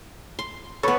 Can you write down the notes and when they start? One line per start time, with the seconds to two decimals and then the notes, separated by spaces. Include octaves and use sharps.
0.39 C6
0.83 B3 A4 B4 C#5